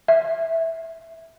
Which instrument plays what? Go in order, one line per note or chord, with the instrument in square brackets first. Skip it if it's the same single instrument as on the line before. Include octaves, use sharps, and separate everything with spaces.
[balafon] E5